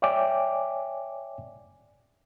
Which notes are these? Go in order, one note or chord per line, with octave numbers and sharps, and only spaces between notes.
C#5 D5 E5 G5 G#5 D6